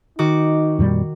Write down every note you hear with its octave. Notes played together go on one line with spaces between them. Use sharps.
D#3 D#4 F#4 D6
F2 A#2 G3